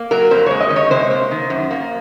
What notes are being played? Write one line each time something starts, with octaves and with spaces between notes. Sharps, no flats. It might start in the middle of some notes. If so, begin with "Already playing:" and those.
Already playing: A#3
F#3 A#4
F2 C5
G#3 C#5
D#5
D#3
C#5
C3 C5
A#3
D#3
F#2
A#3